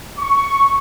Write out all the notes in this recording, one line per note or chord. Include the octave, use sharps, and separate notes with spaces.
C#6